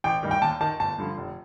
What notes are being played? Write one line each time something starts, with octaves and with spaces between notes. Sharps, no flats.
A1 G5
G2 D#3
G5
D#2 A5
D#3 A5
G1 A5
G2 D3 F3
F1